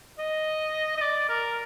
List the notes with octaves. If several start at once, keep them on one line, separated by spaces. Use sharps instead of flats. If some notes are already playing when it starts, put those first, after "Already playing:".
D#5
D#5
D5
A#4